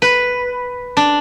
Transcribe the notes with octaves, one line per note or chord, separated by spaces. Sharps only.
B4
D4